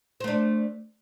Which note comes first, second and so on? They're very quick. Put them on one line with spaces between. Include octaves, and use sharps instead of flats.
C5 A3 D4